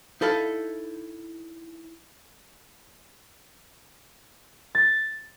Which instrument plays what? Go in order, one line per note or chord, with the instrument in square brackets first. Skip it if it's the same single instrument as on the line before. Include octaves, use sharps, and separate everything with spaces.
[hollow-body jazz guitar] D#4 E4 A4 F5
[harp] A6